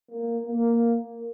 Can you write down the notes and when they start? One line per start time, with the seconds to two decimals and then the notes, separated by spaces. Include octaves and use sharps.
0.11 A#3
0.47 A#3